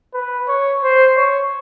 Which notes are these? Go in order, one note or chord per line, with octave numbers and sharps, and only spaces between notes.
B4
C#5
C5
C#5